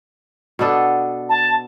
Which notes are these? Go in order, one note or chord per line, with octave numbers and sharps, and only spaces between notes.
B2 B3 D4 A4
A5